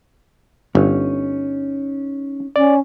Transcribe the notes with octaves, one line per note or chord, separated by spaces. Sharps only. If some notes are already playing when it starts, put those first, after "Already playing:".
G1 C#4 D#4
C#4 D5